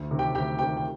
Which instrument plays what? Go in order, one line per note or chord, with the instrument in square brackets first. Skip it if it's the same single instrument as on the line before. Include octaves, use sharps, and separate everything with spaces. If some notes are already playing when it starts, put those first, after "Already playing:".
Already playing: [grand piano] D2
C3 D#3
G4 G5
D2 G4 G5
C3 G4 G5
D#3
G5